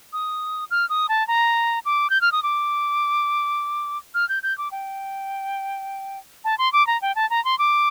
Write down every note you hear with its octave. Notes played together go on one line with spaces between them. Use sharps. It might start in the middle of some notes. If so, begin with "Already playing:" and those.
D#6
F6
D#6
A5
A#5
D6
G6
F6
D#6
D6
F6
G6
G6
D6
G5
A5
C6
D6
A#5
G5
A5
A#5
C6
D6